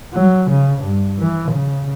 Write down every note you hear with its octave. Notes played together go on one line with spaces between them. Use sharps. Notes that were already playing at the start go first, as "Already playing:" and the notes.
F#3
C#3
G2
E3
C#3